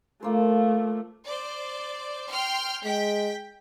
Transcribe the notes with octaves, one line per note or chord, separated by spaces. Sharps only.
F3 A3 A#3 C5
C5 D5
G5 C6 F6
G#3 G5 B6